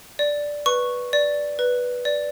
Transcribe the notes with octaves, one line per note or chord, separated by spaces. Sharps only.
D5
B4 C#6
D5
B4
D5